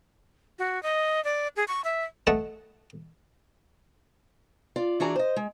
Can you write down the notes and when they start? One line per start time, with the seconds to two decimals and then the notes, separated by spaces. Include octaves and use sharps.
0.59 F#4
0.83 D#5
1.24 D5
1.56 G#4
1.68 C#6
1.84 E5
2.27 A3 D#5 F#5 A5
4.76 F4 D5
5.00 E3 D4 F#4 G#4 D5 A#5
5.16 C5 D#5
5.36 G#3